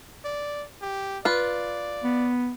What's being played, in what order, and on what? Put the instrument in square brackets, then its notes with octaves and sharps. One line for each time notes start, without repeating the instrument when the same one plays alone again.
[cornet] D5
G4
[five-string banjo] F4 B4 [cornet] D5
[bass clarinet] B3